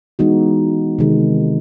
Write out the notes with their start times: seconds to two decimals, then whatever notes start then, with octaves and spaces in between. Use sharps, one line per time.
0.19 E3 G#3 B3 D#4 F#4
0.99 C3 D#3 G#3